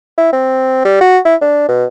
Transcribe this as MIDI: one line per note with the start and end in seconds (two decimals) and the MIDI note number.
0.18 0.32 64
0.33 0.84 60
0.85 1.00 55
1.01 1.18 66
1.25 1.35 64
1.41 1.66 62
1.68 1.85 47